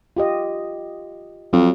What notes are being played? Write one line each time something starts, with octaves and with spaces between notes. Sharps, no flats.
F4 G4 D#5
F2 F#3